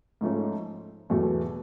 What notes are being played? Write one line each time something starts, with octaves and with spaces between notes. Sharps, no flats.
G#2 F3 A3 C#4
E2 B2 F#3 A3